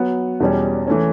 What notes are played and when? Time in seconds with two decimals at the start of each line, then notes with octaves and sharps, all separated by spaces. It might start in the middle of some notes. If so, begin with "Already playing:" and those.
Already playing: F#3 B3 F#4 C#5
0.40 E2 B2 G3 C#4
0.87 E3 A3 C#4